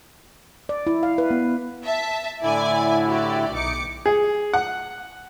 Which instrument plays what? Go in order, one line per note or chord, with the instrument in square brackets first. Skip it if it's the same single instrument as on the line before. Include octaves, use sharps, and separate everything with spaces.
[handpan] D5
E4
F5
B4
B3
[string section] E5 A5
[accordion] A2 D3 E4 [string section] D5 G#5
[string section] F#4 G4 D5
[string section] B1 D6 C#7 [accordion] D#4
[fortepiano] G#4
F#5